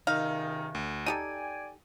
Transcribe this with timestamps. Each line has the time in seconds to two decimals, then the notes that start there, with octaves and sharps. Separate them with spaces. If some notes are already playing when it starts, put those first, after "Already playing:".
0.07 C#2 C3 D#3 D#4 F5
0.75 D2
1.06 D#4 G4 A4 D5 G5 G#5 D#7